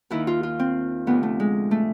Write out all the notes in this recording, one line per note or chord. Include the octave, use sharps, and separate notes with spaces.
D#2 D#3 E4
F4
F4
C4
D2 C3 F3 B3
A3
G#3
A3